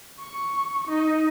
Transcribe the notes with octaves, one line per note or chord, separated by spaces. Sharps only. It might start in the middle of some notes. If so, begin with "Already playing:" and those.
C#6
D#4